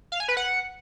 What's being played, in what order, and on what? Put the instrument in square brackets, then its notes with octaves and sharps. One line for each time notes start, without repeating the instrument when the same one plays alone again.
[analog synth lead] F5
G#5
B4
F#5